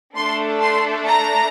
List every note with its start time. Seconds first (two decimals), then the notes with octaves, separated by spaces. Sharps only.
0.16 A3 D4 A4 C6
0.62 C6
1.07 A#5